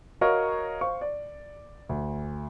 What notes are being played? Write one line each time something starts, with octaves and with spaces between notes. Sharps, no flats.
F#4 A#4 C#5 D#5 F5 C#6
C5 F5 C#6
D5
D2